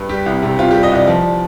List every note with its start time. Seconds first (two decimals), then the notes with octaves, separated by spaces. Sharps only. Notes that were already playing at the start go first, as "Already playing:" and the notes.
Already playing: G2
0.09 G3 G4
0.26 C2
0.43 C3
0.59 C4 F4
0.71 G3 G4
0.83 D#5
0.92 C2 D5
1.07 F3 D5